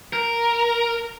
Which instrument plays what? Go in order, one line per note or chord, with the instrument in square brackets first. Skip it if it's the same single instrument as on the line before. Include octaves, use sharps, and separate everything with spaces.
[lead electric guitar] A#4